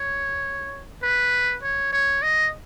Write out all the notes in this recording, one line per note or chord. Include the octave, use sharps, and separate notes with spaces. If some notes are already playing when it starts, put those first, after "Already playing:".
Already playing: C#5
B4
C#5
C#5
D#5